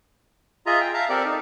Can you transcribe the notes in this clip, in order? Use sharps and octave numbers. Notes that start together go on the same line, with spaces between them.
F4 G#4 D#5 E5 A#5
G5
E5 F5 A5 A#5
C4 G4 A4 A#4 D5
D#4